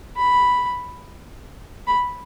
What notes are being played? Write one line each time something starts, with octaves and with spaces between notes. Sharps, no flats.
B5
B5